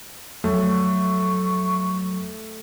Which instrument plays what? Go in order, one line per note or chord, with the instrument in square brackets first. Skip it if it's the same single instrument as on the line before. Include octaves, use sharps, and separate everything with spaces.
[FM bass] F2 [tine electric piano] F#3 [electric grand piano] A3 [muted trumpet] C#6